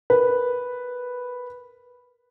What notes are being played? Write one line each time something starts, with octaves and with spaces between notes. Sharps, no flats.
A#4 B4